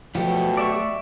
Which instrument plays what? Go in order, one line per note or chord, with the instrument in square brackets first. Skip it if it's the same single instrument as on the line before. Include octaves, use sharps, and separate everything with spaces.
[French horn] B2 [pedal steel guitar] F3 [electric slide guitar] F#3 A3 G4
[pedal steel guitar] D5 E5 C#6